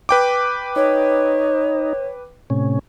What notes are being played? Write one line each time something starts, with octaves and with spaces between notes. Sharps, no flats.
B4 G5 D6
D#4 C#5
A2 C3 C#4